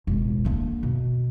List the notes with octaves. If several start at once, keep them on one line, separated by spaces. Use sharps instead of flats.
E1 A1
D3 A#3
B2